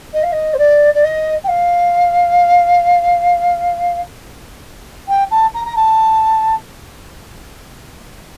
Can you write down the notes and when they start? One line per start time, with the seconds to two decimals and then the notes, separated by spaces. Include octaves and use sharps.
0.14 D#5
0.23 F5
0.32 D#5
0.54 C5
0.58 D5
0.95 D5
1.04 D#5
1.44 G5
1.48 F5
5.08 G5
5.31 A5
5.54 A#5
5.65 A#5
5.76 A5